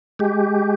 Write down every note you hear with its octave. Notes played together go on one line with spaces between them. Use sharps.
G#3 G4